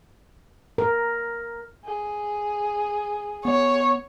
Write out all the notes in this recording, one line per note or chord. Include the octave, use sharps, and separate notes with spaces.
A#4
G#4
B3 C#5